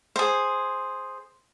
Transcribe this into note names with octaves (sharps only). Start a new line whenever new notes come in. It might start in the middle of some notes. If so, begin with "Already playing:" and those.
G#4 C5